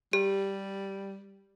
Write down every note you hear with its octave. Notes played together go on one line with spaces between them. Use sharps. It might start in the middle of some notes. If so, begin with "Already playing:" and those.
G3 G4